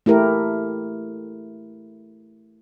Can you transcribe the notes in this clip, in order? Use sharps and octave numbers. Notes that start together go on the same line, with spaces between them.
A3 E4 G4 A#4